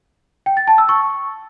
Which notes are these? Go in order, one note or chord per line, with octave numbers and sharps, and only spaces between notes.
G5
A6
A5
E6
C#6